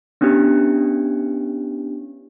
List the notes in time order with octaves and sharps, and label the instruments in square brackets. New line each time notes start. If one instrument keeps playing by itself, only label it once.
[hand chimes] B3 C#4 D4 E4 G4